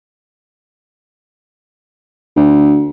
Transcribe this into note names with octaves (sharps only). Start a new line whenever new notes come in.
D2